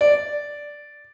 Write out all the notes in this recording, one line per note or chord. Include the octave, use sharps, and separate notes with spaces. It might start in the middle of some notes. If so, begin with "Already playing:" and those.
D5